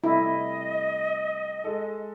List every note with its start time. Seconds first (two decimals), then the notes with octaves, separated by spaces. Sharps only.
0.04 C3 G3 A3 E4 D#5
1.64 G#3 A4